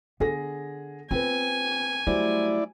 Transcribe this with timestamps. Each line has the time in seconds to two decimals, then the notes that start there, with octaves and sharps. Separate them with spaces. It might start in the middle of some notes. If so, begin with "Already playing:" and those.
0.20 D3 B3 G#4 A#6
1.11 C4 F4 B4 G#5
2.07 F#3 G3 A3 E4 C5 D5